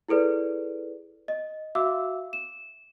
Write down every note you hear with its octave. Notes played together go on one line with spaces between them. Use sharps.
E4 G#4 A4 B4 D5
D#5
F#4 E5 F5 D6 E6
E7